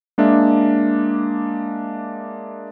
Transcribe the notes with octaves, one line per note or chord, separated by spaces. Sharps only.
G#3 A#3 D4 E5